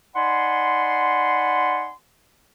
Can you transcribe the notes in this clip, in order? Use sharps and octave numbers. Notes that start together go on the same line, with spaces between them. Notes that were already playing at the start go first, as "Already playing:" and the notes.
D#4 D5 F#5 G#5 B5 C6